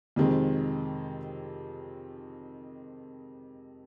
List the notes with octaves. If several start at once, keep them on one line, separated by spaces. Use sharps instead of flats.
F2 C3 D#3 G#3 C4